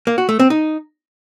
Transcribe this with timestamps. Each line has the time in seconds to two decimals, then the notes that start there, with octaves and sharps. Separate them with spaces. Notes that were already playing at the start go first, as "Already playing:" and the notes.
0.07 A#3
0.18 F#4
0.29 A3
0.40 C4
0.50 D#4